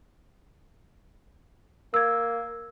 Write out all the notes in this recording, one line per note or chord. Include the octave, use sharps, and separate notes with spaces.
A#3 E6 G#6